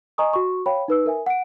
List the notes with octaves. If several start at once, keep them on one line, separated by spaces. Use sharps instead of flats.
D#5 G#5 A#5 C#6 D#6
F#4 C#6
C#5 F5 G5 B5
D#4 B4 E6
A#4 E5 G#5
F#5 D7